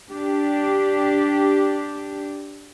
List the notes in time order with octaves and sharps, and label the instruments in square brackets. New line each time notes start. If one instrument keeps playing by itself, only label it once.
[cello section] D4 G4